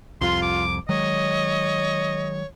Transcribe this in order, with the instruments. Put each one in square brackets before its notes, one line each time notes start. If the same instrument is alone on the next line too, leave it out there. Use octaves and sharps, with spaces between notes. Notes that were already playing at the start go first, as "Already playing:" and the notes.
[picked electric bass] C2 F2 [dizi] F4 [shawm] C6
[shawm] D6
[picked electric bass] D#3 F#3 G#3 [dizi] C#5 [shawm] D#5